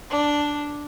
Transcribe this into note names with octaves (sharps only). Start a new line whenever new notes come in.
D4